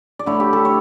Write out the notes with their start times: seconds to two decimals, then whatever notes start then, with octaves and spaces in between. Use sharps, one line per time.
0.19 D5
0.26 D3 A3 E4 C#5
0.40 G4
0.53 A4
0.65 C#5